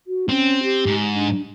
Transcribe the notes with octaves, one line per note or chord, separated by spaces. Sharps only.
F#4
C4 C#4
G4
G#2
D4